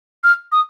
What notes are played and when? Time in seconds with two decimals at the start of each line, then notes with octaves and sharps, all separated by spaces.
0.24 F6
0.52 D#6